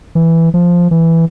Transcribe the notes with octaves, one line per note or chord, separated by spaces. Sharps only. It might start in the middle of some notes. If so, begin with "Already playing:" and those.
E3
F3
E3